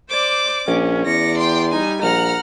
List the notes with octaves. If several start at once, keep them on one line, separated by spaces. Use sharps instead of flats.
C5 D5 D6
A#1 C#4
E2 D5 A#6 C#7
G5 C6
G3 D#4 G#5
A#1 F#5 A#5 F6